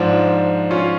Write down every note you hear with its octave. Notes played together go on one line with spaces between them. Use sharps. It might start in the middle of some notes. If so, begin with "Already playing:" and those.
Already playing: G#2 F3 D4
C#4 F4